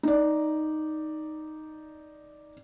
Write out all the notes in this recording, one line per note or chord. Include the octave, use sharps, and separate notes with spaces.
D#4 D5